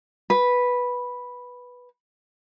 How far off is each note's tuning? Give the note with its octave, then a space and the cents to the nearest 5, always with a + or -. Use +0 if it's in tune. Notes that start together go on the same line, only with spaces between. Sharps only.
B4 -5